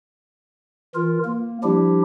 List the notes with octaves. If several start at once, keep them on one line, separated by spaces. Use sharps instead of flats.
E3 F4 A#4
A#3
F3 G3 D4 E4 G4